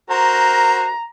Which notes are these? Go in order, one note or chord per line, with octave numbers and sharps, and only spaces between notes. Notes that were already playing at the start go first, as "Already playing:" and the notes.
F#4 A#4 C5 A#5